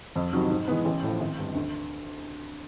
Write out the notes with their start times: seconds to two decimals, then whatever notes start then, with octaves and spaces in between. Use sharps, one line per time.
0.16 F2
0.33 C3 D#3 F#3
0.50 G#2
0.68 E3 G#3 B3
0.85 A1
1.03 A2 F3
1.20 G#1
1.38 G2 D3
1.55 D2